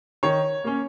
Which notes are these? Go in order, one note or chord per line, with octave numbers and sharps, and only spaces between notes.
D#3 C#5
A#3 C#4